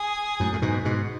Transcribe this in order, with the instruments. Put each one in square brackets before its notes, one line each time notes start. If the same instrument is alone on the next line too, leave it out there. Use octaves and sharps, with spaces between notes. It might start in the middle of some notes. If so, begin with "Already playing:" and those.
Already playing: [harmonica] G#4
[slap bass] F#2 A2
A2
G#2 B2
G#2 B2